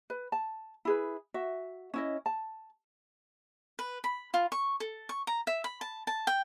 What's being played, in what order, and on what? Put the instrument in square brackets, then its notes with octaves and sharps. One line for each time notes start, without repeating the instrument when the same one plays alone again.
[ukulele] B4
A5
E4 G#4 B4
F#4 E5
C#4 E4 D#5
A5
[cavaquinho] B4
B5
F4
C#6
A4
C#6
A#5
E5
B5
A5
A5
G5